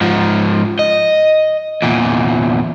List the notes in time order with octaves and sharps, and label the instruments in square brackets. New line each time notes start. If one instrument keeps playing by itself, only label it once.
[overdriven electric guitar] G#2 F3
D#5
E2 A#2